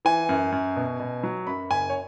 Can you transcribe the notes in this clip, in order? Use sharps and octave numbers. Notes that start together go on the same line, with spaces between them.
E3 G#5
F#2
F#2
B2
B2
F#3
F#2 B5
F#1 G#5
C#5